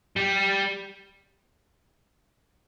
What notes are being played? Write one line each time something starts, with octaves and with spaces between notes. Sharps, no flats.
G3